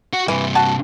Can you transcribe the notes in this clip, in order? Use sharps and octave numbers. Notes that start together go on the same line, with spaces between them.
F#4
G2 C3 E3
F#4 A5